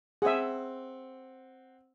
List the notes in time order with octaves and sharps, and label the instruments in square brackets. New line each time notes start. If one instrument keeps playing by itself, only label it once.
[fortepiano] C4 F#5 [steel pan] G#4 E5